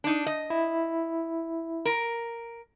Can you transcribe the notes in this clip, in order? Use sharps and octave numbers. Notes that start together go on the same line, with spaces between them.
D4 D#4
D#5
E4
A#4